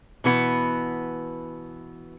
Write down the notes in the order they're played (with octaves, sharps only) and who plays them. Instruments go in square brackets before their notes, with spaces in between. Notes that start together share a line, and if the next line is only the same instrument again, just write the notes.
[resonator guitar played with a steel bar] B2 E3 B3